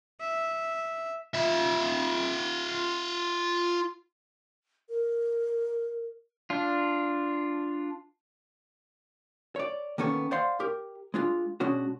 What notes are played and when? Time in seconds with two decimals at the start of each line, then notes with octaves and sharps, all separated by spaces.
0.20 E5
1.35 F4 E5
4.89 A#4
6.50 D4 F4
9.56 C#5 D5
9.98 D#3 A#3 B3 C#4 A4 C#5
10.31 C5 D5 F5 F#5 C6
10.60 G4 A#4
11.14 G#3 D4 F4
11.60 B2 G#3 C#4 D4 F#4